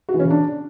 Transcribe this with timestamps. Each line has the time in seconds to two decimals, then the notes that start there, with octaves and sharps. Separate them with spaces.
0.09 F#4
0.14 E3
0.19 C#4
0.25 C#3
0.30 D4